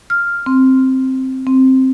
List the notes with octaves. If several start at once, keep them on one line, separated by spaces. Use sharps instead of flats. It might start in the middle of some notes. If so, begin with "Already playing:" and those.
F6
C4
C4